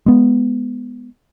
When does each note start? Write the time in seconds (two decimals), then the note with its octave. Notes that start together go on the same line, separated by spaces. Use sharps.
0.06 G#3 B3